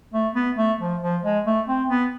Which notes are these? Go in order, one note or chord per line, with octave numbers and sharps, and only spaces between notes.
A3
B3
A3
F3
F3
G#3
A3
C4
B3